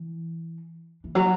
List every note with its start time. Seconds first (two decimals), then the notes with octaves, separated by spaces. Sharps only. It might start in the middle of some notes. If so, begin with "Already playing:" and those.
Already playing: E3
1.04 E3
1.15 F#3